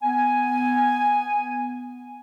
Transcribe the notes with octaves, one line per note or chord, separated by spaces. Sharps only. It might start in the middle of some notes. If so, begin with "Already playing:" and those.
B3 G#5